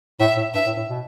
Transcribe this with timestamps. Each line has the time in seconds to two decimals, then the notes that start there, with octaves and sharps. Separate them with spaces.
0.20 A2 E5
0.37 A2
0.54 G2 E5
0.66 A2
0.77 A2
0.89 B2